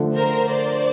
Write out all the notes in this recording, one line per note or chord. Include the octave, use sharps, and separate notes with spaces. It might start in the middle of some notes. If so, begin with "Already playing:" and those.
Already playing: D3 F3 A3 D4
A#4 C5
C5 D5